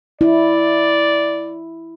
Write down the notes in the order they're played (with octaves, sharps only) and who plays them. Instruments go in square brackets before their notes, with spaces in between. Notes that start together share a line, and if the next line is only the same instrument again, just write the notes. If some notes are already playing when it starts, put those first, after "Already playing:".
[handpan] E4 [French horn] D5